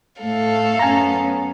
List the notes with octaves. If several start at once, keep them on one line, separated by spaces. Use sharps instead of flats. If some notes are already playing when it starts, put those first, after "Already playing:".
A2 A3 A4 F5
F#2 B3 C#4 G#5 A#5